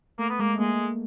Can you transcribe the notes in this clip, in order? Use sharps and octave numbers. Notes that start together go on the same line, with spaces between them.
A3 A#3
B3
G#3 A#3
A3
G#3 A#3